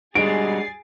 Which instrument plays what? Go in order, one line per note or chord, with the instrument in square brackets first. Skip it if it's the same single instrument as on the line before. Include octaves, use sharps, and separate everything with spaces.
[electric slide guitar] G3 D4 F#4 [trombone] G#3 [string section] G#4 A6 C7 [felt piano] D7